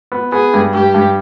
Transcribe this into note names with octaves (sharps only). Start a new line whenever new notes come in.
B3
B3 G#4
G2
G2 G4
G2